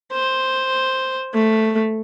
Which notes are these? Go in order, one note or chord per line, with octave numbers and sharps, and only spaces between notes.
C5
A3